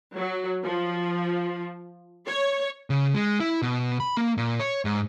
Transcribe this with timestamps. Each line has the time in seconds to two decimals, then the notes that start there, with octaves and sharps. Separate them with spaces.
0.16 F#3
0.63 F3
2.26 C#5
2.90 C#3
3.14 G#3
3.40 E4
3.62 B2
4.00 B5
4.17 A#3
4.38 A#2
4.59 C#5
4.85 G#2